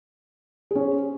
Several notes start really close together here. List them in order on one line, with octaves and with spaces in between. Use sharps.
G#4 C#4 C5